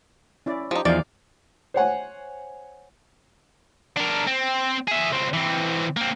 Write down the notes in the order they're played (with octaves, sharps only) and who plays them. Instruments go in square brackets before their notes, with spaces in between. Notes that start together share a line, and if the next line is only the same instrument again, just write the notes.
[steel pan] C#4 E4 D5
[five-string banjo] F3 D#4 [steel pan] G4
[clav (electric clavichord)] E2 F3 [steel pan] D#4 F5 [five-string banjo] D5
[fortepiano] C5 C#5 F#5 G#5
[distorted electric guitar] D4 A#4
C4
G#4 E5
C#2 C4
E3 C4
A#3 C4